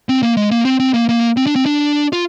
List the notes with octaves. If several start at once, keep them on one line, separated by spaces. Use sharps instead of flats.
C4
A#3
G#3
A#3
C4
C4
A#3
A#3
C4
D4
C4
D4
F4